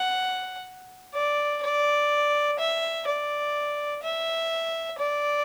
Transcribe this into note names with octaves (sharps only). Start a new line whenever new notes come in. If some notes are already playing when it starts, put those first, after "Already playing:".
Already playing: F#5
D5
D5
E5
D5
E5
D5